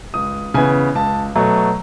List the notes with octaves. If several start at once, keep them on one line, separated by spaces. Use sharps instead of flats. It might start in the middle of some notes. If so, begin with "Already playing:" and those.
C#2 D#6
C#3 E3 B3 G#5
C#2 A5
B2 F#3 A3